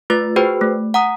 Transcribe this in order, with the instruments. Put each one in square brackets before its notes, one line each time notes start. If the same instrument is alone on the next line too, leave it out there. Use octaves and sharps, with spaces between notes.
[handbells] A3 F4 B4 A6
F#4 G#4 B4 C5 G5
A3
F#5 A#5 D#6